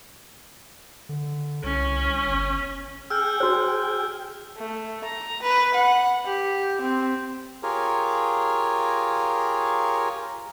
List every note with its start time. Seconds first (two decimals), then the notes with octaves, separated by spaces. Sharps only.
1.09 D3
1.64 C2 C#4
2.25 G1
3.10 G#4 G5 E6 F6 G6
3.40 F#4 C5 E6
4.57 A3
5.04 A#5
5.42 B4
5.74 F#5
6.25 G4
6.81 C4
7.63 F4 G4 G#4 A#4 C#5